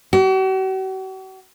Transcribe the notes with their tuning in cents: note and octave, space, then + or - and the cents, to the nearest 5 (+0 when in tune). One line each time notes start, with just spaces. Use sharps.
F#4 +45